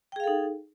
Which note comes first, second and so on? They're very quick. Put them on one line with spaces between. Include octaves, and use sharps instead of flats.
G5 G#4 F5 A4 D#4